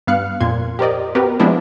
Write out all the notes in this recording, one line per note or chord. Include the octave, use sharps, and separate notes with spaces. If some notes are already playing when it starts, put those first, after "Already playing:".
G2 B3 F5 F6 F#6 C#7
F2 A#2 C6 G#6
G4 A#4 C5 D5 D#5
B3 C4 F#4 G4 A#4 B4
F3 G#3 B3 C4 D4 E4